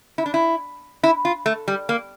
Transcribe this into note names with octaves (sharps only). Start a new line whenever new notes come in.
E4
D4
E4
E4
F4
A3
G3
A#3